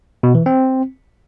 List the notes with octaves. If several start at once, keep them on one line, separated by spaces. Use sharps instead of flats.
B2
E3
C4